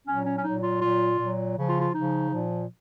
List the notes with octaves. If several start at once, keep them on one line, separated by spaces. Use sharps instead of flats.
A#2 F#3 C#4
C#4
C#4
A#2 F#3 D#4
F4
A#2 F#3 F4
A#2 F#3
C#3 F3
F4
F4
C#3 D#4
F3
A#2 F3